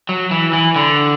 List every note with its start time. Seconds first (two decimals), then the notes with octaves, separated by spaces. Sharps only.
0.09 F#3
0.31 E3
0.53 E3
0.76 D3